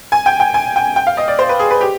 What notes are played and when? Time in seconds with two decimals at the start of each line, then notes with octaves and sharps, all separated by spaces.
0.12 G#5
0.26 G5
0.40 G5
0.54 G#5
0.76 G5
0.96 G5
1.07 F5
1.17 D#5
1.28 D5
1.39 C5
1.49 B4
1.59 G#4
1.71 B4
1.81 G4